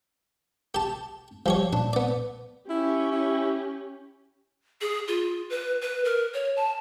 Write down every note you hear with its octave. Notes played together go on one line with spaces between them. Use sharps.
G4 A5
F3 G3 G4 C#5
A#2 D4
B3 D5
C#4 E4 G4
E4
G#4
F4
B4
B4
A#4
C#5
A5